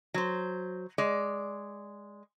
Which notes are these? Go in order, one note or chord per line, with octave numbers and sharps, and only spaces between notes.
F#3 C5
G#3 D5